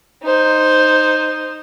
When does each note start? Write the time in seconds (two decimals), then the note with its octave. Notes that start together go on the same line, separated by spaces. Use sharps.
0.23 D#4 C5